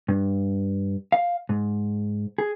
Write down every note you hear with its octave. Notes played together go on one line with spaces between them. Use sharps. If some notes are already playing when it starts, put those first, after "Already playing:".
G2
F5
G#2
G#4